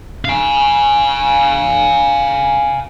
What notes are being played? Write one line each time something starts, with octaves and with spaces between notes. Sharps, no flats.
F5 G#5